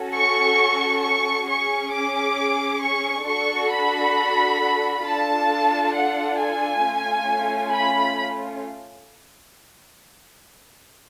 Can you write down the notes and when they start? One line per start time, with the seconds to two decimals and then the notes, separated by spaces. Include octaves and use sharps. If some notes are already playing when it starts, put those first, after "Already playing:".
Already playing: C#4 F#4 A4
0.14 C#6
1.03 C#6
1.48 C#4 G#4 C#6
1.92 D6
2.82 C#6
3.27 D4 F#4 A4 C#6
3.72 B5
5.05 D4 F4 A4 A5
5.95 F#5
6.40 G#5
6.85 A3 C#4 F4
7.74 B5